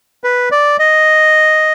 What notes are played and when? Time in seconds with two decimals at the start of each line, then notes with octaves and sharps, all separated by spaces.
0.24 B4
0.51 D5
0.79 D#5